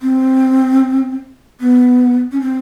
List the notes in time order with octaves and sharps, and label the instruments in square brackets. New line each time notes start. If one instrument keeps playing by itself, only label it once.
[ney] C4
B3
C#4
C4